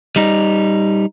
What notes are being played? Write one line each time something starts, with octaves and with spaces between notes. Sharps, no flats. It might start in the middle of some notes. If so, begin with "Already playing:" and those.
G3 D#4